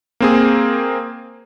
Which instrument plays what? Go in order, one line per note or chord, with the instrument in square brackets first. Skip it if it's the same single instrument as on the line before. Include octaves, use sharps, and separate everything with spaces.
[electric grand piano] A#3 C4 G#4